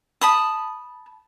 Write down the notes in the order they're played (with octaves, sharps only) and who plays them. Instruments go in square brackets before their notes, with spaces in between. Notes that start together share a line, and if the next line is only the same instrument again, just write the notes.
[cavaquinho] A5 B5 D#6